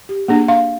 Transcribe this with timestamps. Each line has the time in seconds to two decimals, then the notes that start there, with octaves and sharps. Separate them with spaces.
0.09 G4
0.28 A#3 D4 G#4
0.48 F5